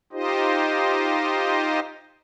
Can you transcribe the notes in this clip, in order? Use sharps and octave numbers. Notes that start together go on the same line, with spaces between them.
D#4 F4 G4 C5 D#5